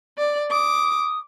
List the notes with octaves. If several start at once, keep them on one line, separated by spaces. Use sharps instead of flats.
D5
D6 D#6